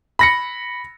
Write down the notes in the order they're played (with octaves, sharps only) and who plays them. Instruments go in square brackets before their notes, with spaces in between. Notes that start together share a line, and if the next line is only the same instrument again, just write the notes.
[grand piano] B5 A#6 C#7